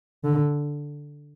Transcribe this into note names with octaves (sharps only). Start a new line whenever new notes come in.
D3